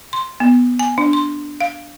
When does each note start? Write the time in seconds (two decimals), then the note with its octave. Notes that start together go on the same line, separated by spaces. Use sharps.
0.13 C6
0.40 B3
0.79 G#5
0.98 D4
1.13 C6
1.61 F5